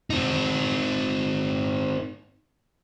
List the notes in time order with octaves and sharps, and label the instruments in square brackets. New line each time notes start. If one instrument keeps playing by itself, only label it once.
[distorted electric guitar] C4 D#4